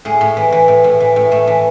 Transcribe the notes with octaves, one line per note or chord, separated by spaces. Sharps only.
A2 G#4
A2
E3
E3
A2
A2
E3
A2
A2 A3
E3